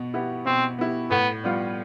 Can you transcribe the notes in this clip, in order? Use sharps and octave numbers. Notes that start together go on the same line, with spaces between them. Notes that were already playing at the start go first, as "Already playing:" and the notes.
Already playing: B2 B3
B3 E4 G4
B2 C4
B3 E4 G4
A2 B3
G3 B3 F4